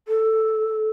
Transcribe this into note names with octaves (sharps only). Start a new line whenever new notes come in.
A4